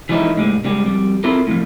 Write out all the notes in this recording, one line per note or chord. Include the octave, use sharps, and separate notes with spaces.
E3 F3 G#3 C#4 D#4 E4
A2 C#3 G3 G#3
C#3 G3 G#3
F2 G3
C4 E4 F4 A4 A#4
A2 D#3 F3